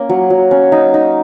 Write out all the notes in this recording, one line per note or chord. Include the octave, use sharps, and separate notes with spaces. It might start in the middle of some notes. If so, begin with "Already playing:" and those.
Already playing: A#3 C#4
F#3
F#3
C#4
D#4
D#4